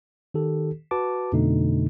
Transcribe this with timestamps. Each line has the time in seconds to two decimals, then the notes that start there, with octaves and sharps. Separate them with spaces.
0.34 D#3 G4 A4
0.91 F#4 B4 A5 D6
1.33 F2 B2 D3 A3 D#4